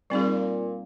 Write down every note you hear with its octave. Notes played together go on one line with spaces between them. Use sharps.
A#2 G3 C4 D#4 G#4